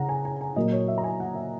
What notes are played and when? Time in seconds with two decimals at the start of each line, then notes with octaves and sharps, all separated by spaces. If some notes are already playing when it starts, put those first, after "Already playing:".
Already playing: C#3 F#5 A#5
0.09 G#5
0.25 G#5
0.41 G#5
0.56 A#2 F#3 A#3 D#5
0.72 C#5
0.88 E5
0.98 A#5
1.04 G#5
1.20 F#5
1.35 E5